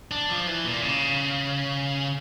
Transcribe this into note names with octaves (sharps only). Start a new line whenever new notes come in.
D4
F3
E3
A#2
C#3